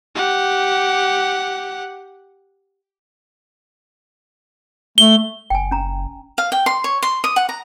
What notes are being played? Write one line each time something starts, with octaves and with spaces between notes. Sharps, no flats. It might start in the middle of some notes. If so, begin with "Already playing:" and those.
G4 F#5
A3 G7
F#1 G5 G#5
C#4 A#5
F5
G5
C6
C#5
C6
D#6
F#5
A#5